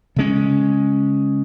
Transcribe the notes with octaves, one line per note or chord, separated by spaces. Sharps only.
C#3 G#3 C#4